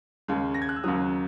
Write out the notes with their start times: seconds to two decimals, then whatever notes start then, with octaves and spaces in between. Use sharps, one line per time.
0.28 D#2 C#3 G#3
0.54 A#6
0.62 G#6
0.69 F#6
0.76 E6
0.84 D#2 C#3 F#3 D#6